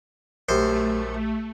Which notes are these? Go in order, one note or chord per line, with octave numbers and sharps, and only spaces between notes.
A#1 F#2 A3 G4 C5 C6